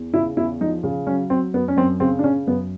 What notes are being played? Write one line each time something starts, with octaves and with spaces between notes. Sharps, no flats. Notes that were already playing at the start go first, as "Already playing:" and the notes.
Already playing: E2
C#3 E4
E2 E4
F3 D#4
C#3
F#3 C#4
F#3 C4
F#2 B3
C#4
F#2 C4
C#3 C4
D4
C#3 C#4
F#2 B3